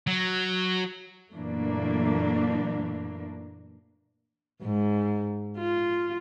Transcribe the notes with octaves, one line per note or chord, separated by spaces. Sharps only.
F#3
F#2 A#2 E3 A3 A#3 D4
G#2
F4